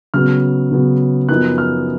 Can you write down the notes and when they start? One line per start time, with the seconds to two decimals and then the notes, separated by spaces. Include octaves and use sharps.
0.14 C#3 F#3 B3 F6
0.71 C#3 F#3 B3
1.28 F#2 F3 B3 D#4 F#6
1.58 F6